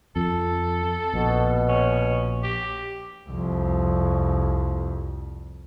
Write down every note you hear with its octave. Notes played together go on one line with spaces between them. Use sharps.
F2 A4
A#1 B2
C#4
G4
C2 F2